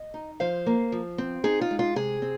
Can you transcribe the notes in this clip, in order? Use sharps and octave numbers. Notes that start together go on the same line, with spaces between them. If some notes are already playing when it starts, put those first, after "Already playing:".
Already playing: D#5
D#4
F3 C5 F5
A#3
F3
C4
D#4 G#4
F4
G#3
F4
C3 G#4
C4